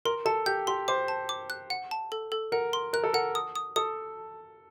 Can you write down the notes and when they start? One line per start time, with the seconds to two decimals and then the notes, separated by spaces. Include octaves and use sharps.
0.05 A#4 C6
0.26 A4 A5
0.46 G4 G6
0.67 G4 C6
0.88 C5 D6
1.08 A5
1.29 D6
1.50 F#6
1.70 F#5
1.91 A5
2.12 A4
2.32 A4
2.52 A#4 F#5
2.73 C6
2.93 A#4 F#6
3.04 A4
3.13 A#4 F#5
3.35 D#6
3.56 D#6
3.76 A4 D#6